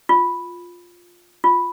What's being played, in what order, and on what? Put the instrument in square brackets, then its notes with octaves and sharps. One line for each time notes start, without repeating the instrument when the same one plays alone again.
[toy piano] F4
F4